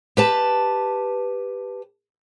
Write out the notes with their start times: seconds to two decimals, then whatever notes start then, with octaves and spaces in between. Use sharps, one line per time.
0.17 G4 B4 A5